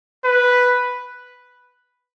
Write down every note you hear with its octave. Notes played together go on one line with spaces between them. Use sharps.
B4